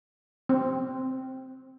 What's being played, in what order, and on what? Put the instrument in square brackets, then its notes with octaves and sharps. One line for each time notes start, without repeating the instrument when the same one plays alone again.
[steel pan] C4